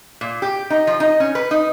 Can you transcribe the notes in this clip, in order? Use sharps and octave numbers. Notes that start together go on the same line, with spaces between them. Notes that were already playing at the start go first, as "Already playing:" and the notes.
A#2
G4
D#4
F3
D#4
C#4
B4
D#4